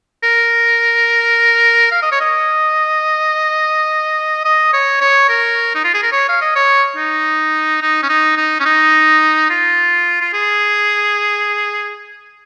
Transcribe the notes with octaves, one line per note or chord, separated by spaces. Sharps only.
A#4
F5
D#5
C#5
D#5
D#5
C#5
C#5
A#4
D#4
F4
G#4
A#4
C#5
F5
D#5
C#5
D#4
D#4
C#4
D#4
D#4
C#4
D#4
F4
F4
G#4